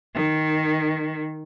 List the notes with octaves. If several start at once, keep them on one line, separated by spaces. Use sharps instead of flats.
D#3